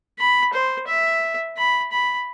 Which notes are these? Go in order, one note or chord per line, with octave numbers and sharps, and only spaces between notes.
B5
C5
E5
B5
B5